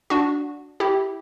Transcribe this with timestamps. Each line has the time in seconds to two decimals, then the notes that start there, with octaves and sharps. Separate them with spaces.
0.10 D4 F#4
0.80 E4 G4